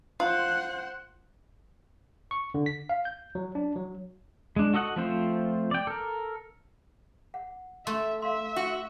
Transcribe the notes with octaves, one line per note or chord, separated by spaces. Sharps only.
F4 C5 F#5
C#6
D3
B6
F5
G6
F#3
D4
F#3
G#3 D4
F#4 A4 D#5 F#5
F3 A3 C4 F4 C5
D5 G5
A4 A#4
F#5
A3 E5 C6
E5 F5 C6
F#4